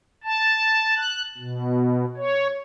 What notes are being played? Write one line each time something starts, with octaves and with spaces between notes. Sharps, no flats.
A5
F#6
B2
C#5